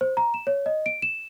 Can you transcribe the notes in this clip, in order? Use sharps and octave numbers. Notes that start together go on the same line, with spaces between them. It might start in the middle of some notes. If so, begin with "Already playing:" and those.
C5
A#5
E7
C#5
D#5
D7
E7